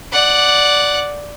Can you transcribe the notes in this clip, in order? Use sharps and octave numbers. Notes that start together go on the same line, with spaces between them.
D5 F#5